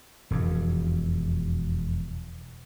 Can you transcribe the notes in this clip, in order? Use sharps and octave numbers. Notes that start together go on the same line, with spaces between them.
E1 F2